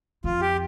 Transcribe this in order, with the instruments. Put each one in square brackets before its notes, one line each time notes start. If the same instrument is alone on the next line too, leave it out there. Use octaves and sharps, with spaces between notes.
[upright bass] F2 [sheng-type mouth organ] F4
[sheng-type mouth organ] G4